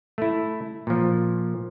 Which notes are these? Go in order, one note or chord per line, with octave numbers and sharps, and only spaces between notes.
A3 E4
A#2 F3